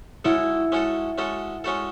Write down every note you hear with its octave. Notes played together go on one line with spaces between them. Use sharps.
G#3 C#4 E4 F#4 A4
G#3 C#4 F#4 A4
G#3 C#4 F#4 A4
G#3 C#4 F#4 A4